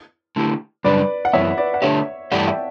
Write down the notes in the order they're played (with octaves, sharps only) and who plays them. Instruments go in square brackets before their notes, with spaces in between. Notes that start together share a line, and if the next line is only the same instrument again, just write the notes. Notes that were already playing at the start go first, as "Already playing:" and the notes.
[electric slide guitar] D3 A3 E4 G4
[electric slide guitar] F#2 C#3 G3 D4 [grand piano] B4 D5
[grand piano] F#5
[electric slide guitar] F#2 E3 B3 [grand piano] C#5 E5
[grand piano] B4 D5
F#5
[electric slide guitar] D3 A3 D4 G4 [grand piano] C#5 E5
[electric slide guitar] G2 E3 A3 E4 G4 [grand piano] D5 F#5
[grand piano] A5
E5 G5